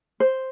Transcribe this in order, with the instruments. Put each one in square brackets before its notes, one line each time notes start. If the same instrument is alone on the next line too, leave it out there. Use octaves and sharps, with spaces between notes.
[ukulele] C5